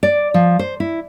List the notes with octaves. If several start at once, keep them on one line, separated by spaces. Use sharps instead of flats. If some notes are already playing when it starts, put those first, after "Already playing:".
D5
F3
C5
E4